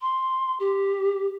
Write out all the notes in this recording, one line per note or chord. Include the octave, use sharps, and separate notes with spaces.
C6
G4